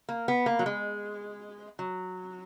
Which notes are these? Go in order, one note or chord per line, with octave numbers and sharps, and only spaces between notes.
A#3
B3
A#3
F#3
G#3
F#3